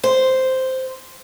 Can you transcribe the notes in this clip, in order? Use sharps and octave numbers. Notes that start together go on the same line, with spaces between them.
C5